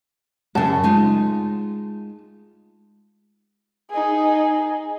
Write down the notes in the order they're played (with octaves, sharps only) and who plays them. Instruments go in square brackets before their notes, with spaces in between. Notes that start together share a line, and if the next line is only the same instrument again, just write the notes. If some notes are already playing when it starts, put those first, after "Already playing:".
[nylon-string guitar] F#2 C#3 [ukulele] A5
[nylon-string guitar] G#3 D#4 F4
[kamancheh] D#4 G#4